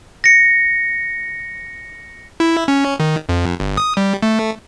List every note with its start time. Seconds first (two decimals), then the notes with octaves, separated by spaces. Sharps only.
0.24 A#6 C#7
2.40 E4
2.68 C#4
3.00 D#3
3.29 F2
3.60 G1
3.77 D#6
3.97 G3
4.23 A3